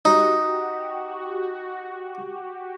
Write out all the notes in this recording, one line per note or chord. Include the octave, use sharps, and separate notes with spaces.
D#4 F#4 G4